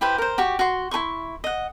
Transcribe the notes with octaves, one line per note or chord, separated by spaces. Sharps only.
E4 G4 B4 C5
A#4 C5
F#4 G4 C#6
F#4 C6
E4 A4 C6 C#6
D#5 F#5